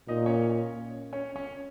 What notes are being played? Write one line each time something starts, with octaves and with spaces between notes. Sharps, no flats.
A#2 D#4 D#5
C#4 C#5
C#4 C#5
C#4 C#5